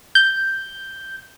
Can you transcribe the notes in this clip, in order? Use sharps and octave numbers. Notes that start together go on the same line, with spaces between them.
G6